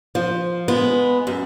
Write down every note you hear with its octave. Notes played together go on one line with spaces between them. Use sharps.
F3
G#3 B3
F#2